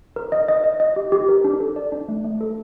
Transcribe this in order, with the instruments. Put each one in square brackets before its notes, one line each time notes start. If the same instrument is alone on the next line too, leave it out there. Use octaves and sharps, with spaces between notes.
[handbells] A#4
D#5
D#5
D#5
D#5
G4
G4
A#4
D4
A4
D5
D4
A3
A3
A4